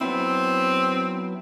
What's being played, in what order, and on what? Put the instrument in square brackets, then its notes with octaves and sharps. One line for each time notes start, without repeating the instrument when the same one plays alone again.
[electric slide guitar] F#3 B3 E4 [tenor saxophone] C4